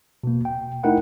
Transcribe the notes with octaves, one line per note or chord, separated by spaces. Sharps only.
B2 A#3
G5
A3 D#4 E4 A#4 F#5 G5